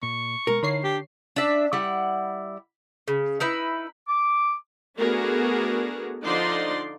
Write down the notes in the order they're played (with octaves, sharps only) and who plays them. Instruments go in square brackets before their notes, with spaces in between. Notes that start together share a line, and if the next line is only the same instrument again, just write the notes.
[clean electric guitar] A#2 [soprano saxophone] C#6
[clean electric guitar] B2 G#3 [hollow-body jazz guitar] A#4
[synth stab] D3 C#5 C7 [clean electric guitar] D#4 E4 D#5
[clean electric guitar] D4 A5 [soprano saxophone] G4
[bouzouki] D4 E5
G3 E4 F#5
C#3
D#4 E4 B4
[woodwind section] D6
[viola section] A3 B3 D4 F#4 G#4 A#4
D3 F3 D#4 D5 C6